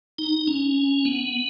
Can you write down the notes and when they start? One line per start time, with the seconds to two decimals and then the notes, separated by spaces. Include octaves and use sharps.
0.18 D#4
0.47 C#4
1.05 B3